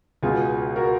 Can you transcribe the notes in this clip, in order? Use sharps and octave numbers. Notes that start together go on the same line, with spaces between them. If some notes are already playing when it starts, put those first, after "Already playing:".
C#2 B2 F4 G#4
F#4 A#4